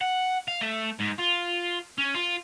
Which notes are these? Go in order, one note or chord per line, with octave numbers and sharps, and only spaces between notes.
F#5
F5
A3
G#2
F4
C#4
F4